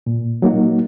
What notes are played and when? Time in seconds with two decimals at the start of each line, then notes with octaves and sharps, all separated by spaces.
0.06 A#2
0.42 F#3 A#3 D#4 F#4